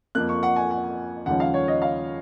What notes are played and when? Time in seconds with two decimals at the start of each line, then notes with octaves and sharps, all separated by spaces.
0.15 F2 F3 A#3 F#6
0.29 C#6
0.43 F#5
0.56 G#5
0.71 F#5
1.26 D#2 C#3 F3 G#3 C#4 F#5
1.40 F5
1.54 C#5
1.68 D#5
1.82 F5